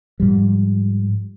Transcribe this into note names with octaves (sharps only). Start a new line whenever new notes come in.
G#2 F3 G3